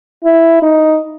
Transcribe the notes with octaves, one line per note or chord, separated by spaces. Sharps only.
E4
D#4